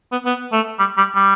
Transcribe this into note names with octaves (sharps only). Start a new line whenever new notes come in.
B3
B3
A3
G3
G3
G3